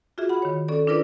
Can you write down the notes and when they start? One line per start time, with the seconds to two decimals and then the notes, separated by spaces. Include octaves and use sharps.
0.18 F4 F#4 G#4 E5
0.29 F#5 B5
0.42 D#3 C#5
0.68 C#4 A4 D5
0.87 D4 E4 F4 A#4 B4 D5